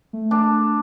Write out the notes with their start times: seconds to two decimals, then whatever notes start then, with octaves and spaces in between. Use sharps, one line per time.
0.13 A3
0.31 D4